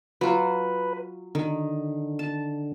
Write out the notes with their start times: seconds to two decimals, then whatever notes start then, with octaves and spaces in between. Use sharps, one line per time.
0.21 F#3 F4 B4
1.35 D3 D#3
2.19 A5